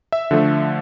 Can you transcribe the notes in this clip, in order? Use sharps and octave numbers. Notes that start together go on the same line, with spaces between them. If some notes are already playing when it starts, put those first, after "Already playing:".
E5
D3 F3 A3